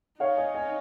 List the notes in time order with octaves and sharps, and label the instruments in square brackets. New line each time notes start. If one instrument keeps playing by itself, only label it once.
[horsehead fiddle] D#4 [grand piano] C#5 F5
[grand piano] D#5 G#5
D#5 G#5